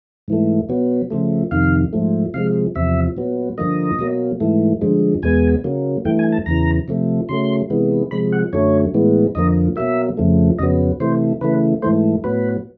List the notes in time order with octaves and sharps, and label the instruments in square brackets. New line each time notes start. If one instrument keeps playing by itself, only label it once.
[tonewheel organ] G#2 E3 A3
B2 F#3 B3
C#3 F3 A3
F2 C3 D#3 F5
G#2 F3 A3
C3 F3 G#3 F5
E2 C3 F3 E5
A#2 F#3 B3
G2 D3 F3 A#3 D#5
B2 F#3 A#3
G#2 E3 A3
G2 D3 F3 G#3
E2 B2 G#3 B3 G#5
C#3 F#3 A#3
G2 E3 A3 G5
G#5
A5
E2 C#3 E3 A#5
C3 F3 A3
C#3 F#3 A3 C6
C3 E3 G#3 B3
C3 F3 G#3 B5
F#5
F#2 D3 F#3 A3 C#5
A2 E3 G#3 B3
F2 D3 F3 A#3 D#5
B2 F#3 A#3 E5
F2 C#3 F3 A3
F2 C#3 F#3 B3 D#5
C3 E3 A3 C5
C#3 E3 A3 B4
G#2 E3 A3 C5
A2 F#3 B3 B4